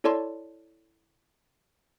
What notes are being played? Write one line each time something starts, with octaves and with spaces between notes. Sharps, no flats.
E4 A4 C#5 D5 A5 C6